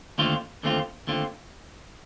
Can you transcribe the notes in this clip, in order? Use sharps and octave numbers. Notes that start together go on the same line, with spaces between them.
D#2 D3 A3 C4 F4
D#2 D3 A3 C4 F4
D#2 D3 A3 C4 F4